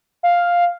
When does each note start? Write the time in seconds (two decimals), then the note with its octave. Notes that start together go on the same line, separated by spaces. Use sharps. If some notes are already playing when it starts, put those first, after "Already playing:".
0.23 F5